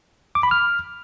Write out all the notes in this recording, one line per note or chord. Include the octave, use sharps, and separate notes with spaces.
D6
B5
F6